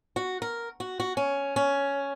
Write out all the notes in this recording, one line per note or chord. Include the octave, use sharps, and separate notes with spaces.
F#4
A#4
F#4
F#4
C#4
C#4